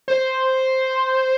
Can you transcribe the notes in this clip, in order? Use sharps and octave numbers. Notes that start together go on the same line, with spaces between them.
C5